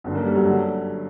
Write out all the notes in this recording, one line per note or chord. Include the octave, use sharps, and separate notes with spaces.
G1 F#2 D3
A#3
G3
F#3
D3